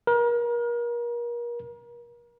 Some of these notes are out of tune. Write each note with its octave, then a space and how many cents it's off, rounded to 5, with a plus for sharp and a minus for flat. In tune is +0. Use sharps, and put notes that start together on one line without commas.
A#4 +35